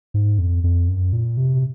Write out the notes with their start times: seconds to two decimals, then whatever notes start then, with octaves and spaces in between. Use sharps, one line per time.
0.14 G#2
0.38 F2
0.64 F2
0.88 F#2
1.13 A#2
1.37 C3